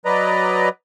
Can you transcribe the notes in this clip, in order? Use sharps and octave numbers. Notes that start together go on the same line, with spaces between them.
F#3 B4 D5 D#5 A#5